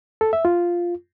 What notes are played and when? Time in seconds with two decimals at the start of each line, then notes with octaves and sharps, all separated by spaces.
0.21 A4
0.33 E5
0.45 F4